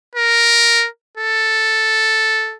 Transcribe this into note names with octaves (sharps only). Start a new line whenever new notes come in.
A#4
A4